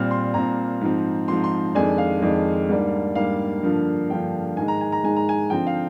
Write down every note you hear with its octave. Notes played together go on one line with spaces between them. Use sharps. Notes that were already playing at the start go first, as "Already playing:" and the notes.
Already playing: A#2 G3 C4 F6
C6
A#2 G3 C4 A#5
G#2 F3 C4
G#2 F3 C4 C6
C6
F2 D#3 G#3 D4 G#5
F5
F2 D#3 G#3 D4
G#2 G3 A#3 D4
G#2 G3 A#3 D4 F5
G2 D3 F3 A#3
G2 D3 F3 A#3 G5
G#2 D#3 G#3 G#5
A#5
G#5
A#5
G#2 D#3 G#3 G#5
A#5
G#5
D3 F3 C4 G5
F5